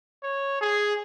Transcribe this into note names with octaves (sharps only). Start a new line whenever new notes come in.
C#5
G#4